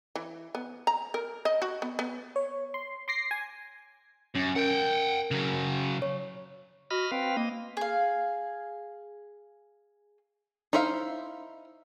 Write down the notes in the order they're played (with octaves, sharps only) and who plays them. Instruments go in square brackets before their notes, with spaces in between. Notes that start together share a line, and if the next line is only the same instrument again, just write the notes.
[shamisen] E3
B3
A#5
A#4
D#5
F#4
B3
B3
[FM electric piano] C#5
C6
C6 D6 A#6 C7
G#5
[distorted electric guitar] F#2 [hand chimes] C#4
[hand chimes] A#4 [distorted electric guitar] F#5 G5
[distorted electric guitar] C#3 F#3
[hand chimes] C#5
[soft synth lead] F#4 [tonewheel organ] D#5 B5 F6
[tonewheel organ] C4 B4 F5 [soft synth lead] G5
[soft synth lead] A#3 [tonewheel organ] D#5
[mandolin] G#4 F5
[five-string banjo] D#4 E4 C5 E5 F5